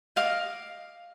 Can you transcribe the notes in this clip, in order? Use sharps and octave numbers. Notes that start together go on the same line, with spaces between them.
D#5 F5 D6